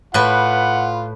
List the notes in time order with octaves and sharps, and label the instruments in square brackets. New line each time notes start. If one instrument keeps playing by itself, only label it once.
[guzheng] A2 B4 [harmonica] F4 [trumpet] F#5